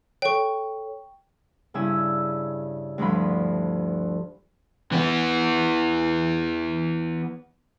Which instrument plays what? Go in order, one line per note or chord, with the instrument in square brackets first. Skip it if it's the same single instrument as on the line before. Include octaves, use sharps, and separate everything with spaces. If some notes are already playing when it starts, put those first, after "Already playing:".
[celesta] A4 C#5 [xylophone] G5 C#6
[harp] G2 C#3 E4 G#5 E6
D2 G2 F3 F4 B5
[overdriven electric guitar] E3 B3